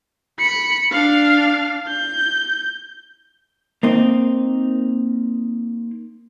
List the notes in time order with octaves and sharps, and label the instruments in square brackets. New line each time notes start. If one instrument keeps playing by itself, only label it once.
[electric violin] B5 C#7
D4 F5
G6
[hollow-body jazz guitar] A#3 C4 D#4